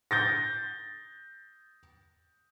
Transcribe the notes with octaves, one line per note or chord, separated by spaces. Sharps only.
G6 A6 A#6